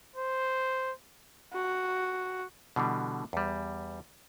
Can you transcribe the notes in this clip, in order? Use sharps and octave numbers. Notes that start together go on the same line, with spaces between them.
C5
F#4
B2 D3 E3 G3
E2 G3